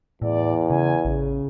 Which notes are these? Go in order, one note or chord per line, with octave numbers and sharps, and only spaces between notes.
E2 A2 D5
C#3 G#5
A1 C#3